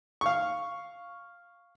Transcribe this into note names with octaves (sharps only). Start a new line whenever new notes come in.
F5 C#6